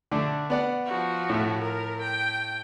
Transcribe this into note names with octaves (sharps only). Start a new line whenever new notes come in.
D3 A3 D4
B3 D5 F#5
F3 F#4
A2 A3
A#4
G5